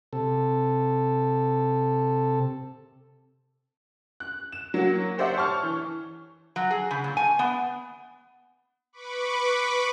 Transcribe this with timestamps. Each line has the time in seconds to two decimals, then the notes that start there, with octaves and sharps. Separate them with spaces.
0.13 C3 A4
4.20 F#6
4.52 E7
4.74 F#3 A#3 F#4
5.18 G4 C5 D5 E5 F#5
5.36 C#5 A5 C#6 F6
5.63 E3
6.56 F#3
6.71 G#4
6.91 C#3
7.04 A#2
7.17 G#5
7.39 B3
8.93 B4 B5 C#6 D6